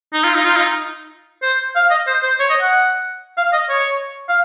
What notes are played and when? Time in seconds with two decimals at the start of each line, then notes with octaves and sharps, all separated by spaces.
0.13 D#4
0.24 F4
0.35 D#4
0.45 F4
0.56 D#4
1.42 C5
1.75 F5
1.91 D#5
2.07 C5
2.23 C5
2.40 C#5
2.50 D#5
2.61 F#5
3.38 F5
3.53 D#5
3.69 C#5
4.29 F5